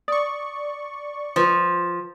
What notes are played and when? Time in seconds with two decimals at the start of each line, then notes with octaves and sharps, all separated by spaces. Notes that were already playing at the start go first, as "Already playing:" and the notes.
0.08 D5 C#6 D#6
1.36 F3 F4 B4 C5